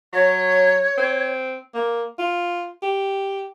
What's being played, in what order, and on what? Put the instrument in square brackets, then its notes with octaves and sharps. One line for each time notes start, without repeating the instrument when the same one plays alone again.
[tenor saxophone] F#3 [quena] C#5
[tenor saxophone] C4
[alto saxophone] A#3
F4
G4